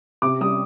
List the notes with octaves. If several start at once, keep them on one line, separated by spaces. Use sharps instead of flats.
C3 D6
G3 D#6